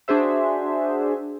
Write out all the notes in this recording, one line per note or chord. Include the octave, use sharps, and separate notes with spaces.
D4 F#4 G#4 C5 E5